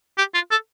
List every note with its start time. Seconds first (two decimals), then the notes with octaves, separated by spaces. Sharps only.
0.18 G4
0.35 F4
0.51 A4